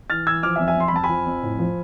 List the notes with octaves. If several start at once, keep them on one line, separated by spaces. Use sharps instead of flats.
E3 F6 A6
E3 E6 G#6
F3 D6 F6
E5 G#5
F2
E5 G#5
F2 C6
B5
F2 A5
G#5 B5
F3
F2
A2
F3